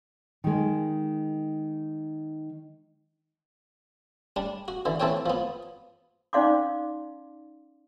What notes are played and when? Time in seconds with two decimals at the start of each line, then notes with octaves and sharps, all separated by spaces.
0.44 D#3 G#3
4.36 G3 D4
4.68 F#4
4.85 D3 E3
5.00 E3 C4 A4 C#5 G5
5.26 F3 B3
6.33 C#4 D#4 D5 F5 C6 D6